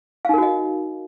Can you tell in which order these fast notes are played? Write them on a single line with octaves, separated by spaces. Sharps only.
F5 D#4 A#4 F#4 D#5